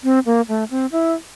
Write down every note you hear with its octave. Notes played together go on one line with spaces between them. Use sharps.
C4
A#3
A3
C4
E4